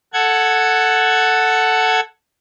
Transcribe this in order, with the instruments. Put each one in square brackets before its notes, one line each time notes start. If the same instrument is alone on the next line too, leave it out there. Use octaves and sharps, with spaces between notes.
[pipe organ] A4 F#5 G#6